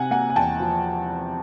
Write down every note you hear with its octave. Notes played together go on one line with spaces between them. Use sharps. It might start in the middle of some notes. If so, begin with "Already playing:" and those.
Already playing: C3 F#5 G#5
A#3 F#5 G#5
G#5
E2 G5 A5
F3